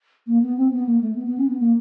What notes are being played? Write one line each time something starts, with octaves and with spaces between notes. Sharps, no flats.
A#3
B3
C4
B3
A#3
A3
B3
B3
C#4
B3
A#3